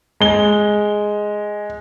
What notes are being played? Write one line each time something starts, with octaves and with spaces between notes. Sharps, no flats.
G#3 G7